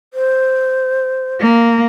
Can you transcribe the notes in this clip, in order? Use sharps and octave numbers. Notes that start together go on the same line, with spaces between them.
C5
A#3